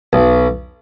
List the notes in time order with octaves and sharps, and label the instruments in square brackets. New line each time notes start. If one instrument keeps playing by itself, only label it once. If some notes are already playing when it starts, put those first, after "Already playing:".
[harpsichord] B1